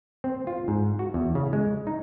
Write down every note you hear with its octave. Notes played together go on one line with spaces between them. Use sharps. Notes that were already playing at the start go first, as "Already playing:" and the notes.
C4
F4
G#2
F#4
E2
C#3
G#3
D#4